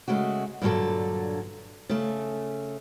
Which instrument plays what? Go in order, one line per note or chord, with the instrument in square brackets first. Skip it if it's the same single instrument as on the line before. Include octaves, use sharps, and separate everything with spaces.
[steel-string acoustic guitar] C#3 G#3 A3 F#4
G2 A#2 D3 E3 F#3 A4
C#3 A3